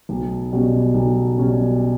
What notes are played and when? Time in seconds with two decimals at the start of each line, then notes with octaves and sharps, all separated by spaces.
0.09 B1
0.52 B2 G3 C#4
0.94 B1
1.37 B2 G3 C#4